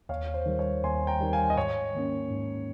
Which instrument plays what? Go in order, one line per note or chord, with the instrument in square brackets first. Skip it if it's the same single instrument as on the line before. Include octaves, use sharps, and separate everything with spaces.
[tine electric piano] D#2 [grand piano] C#5 F5
[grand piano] C5
[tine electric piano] D#3 G3
[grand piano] C#5
[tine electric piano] D#2 [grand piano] G#5 C6
[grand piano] G5 A#5
[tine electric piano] D#3 G3
[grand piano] F5 G#5
D#5
[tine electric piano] G#2 [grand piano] C#5
[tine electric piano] D#3 A#3 C#4
G#2